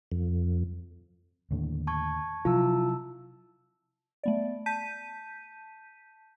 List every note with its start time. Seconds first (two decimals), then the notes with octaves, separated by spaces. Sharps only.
0.12 F2
1.51 D#2 A2 D3
1.87 A5 C#6 G#6
2.45 C3 F3 F#3 E4 F4 A5 E6
4.24 A3 B3 D5
4.66 A5 G6 B6 D#7